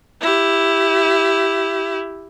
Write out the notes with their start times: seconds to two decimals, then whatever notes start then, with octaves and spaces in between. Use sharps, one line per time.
0.22 E4 G4